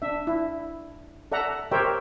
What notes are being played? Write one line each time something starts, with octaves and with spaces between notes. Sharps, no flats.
D4 E5
E4
A4 D5 E5 F#5 A#5
G4 A#4 C5 C#5 E5 G5